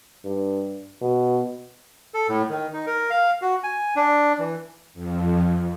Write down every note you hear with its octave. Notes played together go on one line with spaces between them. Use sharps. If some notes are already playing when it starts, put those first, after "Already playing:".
G2
B2
A4
A2
D#3
D#4
A#4
F5
F#4
G#5
D4
E3
F2